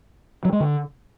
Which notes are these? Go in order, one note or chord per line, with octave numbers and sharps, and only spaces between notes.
F#3
G#3
D3